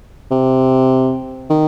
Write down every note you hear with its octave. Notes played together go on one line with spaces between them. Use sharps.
C3
D#3